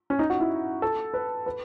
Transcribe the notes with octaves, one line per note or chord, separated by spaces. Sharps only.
C#4
D#4
F#4
E4
A4
B4
B4